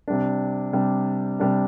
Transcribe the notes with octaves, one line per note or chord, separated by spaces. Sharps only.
C3 G3 D4
C3 G3 D4
C3 G3 D4